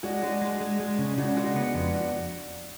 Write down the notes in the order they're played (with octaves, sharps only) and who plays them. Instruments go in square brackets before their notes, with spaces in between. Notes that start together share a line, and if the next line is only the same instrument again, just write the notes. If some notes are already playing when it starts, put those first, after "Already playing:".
[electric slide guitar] G#3 [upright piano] D4 F#4
[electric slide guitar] G#3 [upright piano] D4 F#4
[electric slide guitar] G#3
G#3
G#3
C#3
[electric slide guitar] C#3 [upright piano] D4 F#4
[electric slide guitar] G#3 [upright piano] D4 F#4
[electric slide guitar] B3
F2
[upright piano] D4 F#4